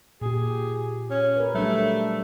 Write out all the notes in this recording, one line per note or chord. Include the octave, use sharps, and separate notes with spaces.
A#2 G4 G#4
C#4
A#4 B4
F#3 G3 A3 D4